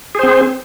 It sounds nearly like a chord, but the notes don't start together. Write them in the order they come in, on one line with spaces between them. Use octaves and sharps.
G#4 C5 C4